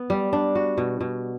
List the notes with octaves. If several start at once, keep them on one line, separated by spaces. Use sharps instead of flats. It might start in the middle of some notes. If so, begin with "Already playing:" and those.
Already playing: B3
G3
D4
F#4
B2
B2